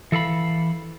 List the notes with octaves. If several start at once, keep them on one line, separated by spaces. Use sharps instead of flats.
E3 A4 F5 B5